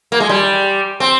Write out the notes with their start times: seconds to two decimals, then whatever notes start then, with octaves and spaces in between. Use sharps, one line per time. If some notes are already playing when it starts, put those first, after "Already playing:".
0.12 A#3
0.20 G#3
0.29 G3
1.00 C4